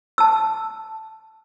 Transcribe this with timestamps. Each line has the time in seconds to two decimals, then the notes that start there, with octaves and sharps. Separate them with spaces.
0.18 A5 E6